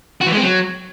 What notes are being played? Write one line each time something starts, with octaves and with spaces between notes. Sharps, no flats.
F#4
E3
G#3
C4
F#3